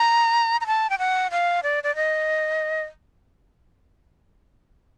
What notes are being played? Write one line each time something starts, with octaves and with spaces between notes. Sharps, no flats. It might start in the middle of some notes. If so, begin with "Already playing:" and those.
Already playing: A#5
A#5
A5
G5
F#5
F5
D5
D5
D#5